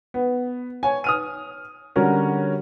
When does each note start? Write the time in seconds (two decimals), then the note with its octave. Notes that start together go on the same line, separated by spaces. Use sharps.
0.14 B3
0.83 C#5 G#5
1.04 D#6 F6 D#7
1.96 D3 G3 C#4 F#4 A#4